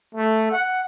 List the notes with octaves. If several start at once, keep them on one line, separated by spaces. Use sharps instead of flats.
A3
F#5